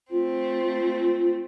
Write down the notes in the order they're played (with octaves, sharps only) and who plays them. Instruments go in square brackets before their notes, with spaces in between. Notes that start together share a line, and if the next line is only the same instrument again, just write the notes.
[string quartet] A3 C4 [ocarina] F4